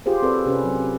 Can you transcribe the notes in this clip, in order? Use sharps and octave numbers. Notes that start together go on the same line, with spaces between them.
F4 G4 G#4 C5
C4 A4 B4 D5
C3 C#4 B4
F#3